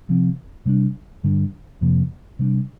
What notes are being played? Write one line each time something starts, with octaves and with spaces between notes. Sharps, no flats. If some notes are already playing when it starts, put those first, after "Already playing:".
C3 F3 C4
C3 G3 A#3 D4
G2 D3 G3 D4
F2 C3 F3 A#3
C3 G3 D4